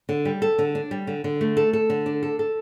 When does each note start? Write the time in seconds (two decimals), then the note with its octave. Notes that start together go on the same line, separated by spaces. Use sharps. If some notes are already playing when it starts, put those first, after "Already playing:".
0.09 D3
0.25 G3
0.42 A4
0.59 D3
0.75 D4
0.91 G3
1.07 D3
1.24 D3
1.41 A3
1.57 A4
1.73 A4
1.90 D3
2.06 D4
2.23 A4
2.39 A4